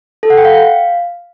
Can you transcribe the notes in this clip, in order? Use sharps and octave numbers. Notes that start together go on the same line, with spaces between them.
A4
F#5
G5
F5